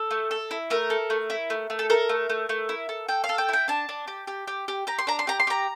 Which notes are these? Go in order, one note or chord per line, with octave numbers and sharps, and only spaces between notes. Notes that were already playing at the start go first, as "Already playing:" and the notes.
Already playing: A4
A3
A4
E4
A3 A#4
A4
A3
E4
A3
A3
A4
A4 A#4
A3
A3
A3
E4
A4
A4 G5
F5
A4
G5
E4 G5
D4 A5
D4
G4
G4
G4
G4
G4 A#5
C6
D4 A#5
C6
G4 A#5
C6
G4 A#5